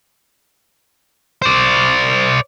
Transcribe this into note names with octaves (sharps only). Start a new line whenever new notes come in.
C5 D5